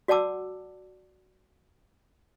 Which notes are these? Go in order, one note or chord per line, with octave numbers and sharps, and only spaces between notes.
F#4 D5 F#5 A5 D6 E6